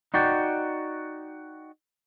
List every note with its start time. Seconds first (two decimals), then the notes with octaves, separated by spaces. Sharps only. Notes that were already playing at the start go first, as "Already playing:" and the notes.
0.14 D#4 F#4 D5 G5